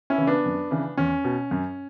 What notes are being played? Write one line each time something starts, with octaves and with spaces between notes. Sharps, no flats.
C#4 E4
C#3 E3
B3 D4
F#2
C#3 E3
E2 C#4
B2
F#2